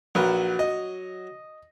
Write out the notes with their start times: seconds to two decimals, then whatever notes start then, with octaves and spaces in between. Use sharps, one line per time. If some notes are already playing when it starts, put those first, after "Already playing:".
0.15 A#1 F#3 A#4 B4
0.59 D#5